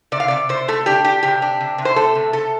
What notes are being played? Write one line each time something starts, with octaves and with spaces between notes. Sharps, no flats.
C3 D5
F5
C3 D5
C3 C5
A3 A4
D4 G4
D4 G4
C3 G4
D4
C3
C3
C5
A3 A4
C3
C3 A4